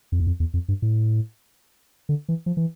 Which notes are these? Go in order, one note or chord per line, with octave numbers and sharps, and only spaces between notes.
F2
E2
F2
E2
F2
G2
A2
D3
E3
F3
E3